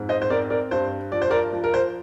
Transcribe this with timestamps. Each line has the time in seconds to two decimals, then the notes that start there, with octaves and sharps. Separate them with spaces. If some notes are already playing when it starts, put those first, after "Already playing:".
Already playing: F2 G#2
0.09 C5 D#5
0.22 C5
0.30 C4 A#4 D5
0.50 A#4 D5
0.71 G2 C5
1.12 F3 D5
1.22 C5
1.30 A#4 D5
1.53 F3
1.64 A#4
1.74 C5